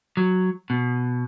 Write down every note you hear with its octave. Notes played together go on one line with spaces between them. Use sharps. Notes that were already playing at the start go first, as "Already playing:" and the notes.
F#3
B2